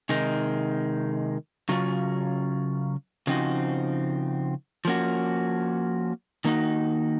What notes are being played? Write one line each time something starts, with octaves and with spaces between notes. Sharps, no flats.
C3 D#3 G#3 D#4
C#3 F#3 C#4 F4
C#3 F3 C4 D#4 F#4
F3 A#3 C#4 F#4
D#3 A#3 D#4 F#4